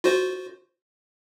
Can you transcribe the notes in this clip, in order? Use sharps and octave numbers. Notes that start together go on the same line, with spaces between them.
F4 F#4 C5